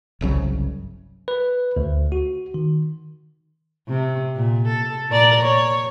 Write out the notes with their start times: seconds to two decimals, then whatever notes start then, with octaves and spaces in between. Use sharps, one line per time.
0.21 G1 C2 C#3 F#3
1.28 B4
1.76 D2
2.12 F#4
2.54 D#3
3.88 C3
4.36 A#2
4.68 A4
5.10 A#2 A#4 D5
5.43 C#5